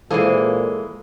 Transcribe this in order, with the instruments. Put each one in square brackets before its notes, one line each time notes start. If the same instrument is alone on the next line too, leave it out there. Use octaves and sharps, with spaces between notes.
[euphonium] A#2 [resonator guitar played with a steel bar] E3 G#3 A#3 [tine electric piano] A4 [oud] C5 F5